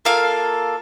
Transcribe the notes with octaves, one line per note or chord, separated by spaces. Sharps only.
A#3 F4 A4 F5